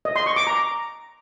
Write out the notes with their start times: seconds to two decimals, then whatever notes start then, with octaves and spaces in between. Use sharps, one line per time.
0.05 D#5
0.16 C6
0.26 C#6
0.36 D6
0.47 A#5